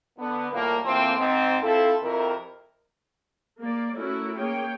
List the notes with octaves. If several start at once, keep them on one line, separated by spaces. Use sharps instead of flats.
D3 B3
A2 F3 G3 A#3
E3 F3 A3 A#3 C4
G#2 C4
C4 E4 F4 A4
F2 C3 E4 A#4
A#3 D5
A3 C#4 E4 F#4 A#4
A#3 G#4 C#5 G5